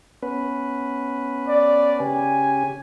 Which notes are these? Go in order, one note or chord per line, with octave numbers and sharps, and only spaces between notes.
B3 C#4 B4
D5
C#3 C#4 G4 G#5